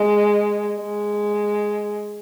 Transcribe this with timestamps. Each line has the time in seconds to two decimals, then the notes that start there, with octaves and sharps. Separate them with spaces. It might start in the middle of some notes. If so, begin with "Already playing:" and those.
Already playing: G#3
0.80 G#3